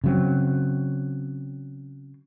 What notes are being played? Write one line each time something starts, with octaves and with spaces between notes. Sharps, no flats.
C#3 F#3 C4